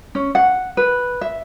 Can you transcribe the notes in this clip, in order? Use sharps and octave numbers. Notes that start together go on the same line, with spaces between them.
C#4
F#5
B4
E5